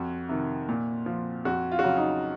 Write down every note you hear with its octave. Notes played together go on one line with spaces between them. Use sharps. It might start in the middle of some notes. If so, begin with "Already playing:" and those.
Already playing: F2 F#4
C3 D#3
A#2
F3
F2 F#4
F4
F#4
C#3 F#3 F4
D#4